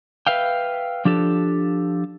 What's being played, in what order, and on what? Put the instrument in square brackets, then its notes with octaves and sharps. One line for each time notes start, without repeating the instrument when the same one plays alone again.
[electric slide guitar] B4 E5 F5 G5
F3 D4 G4 A4